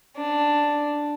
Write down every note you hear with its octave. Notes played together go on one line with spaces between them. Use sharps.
D4